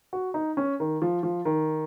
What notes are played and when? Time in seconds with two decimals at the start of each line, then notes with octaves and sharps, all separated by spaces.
0.13 F#4
0.34 D#4
0.57 C#4
0.80 D#3
1.02 F3
1.23 F3
1.45 D#3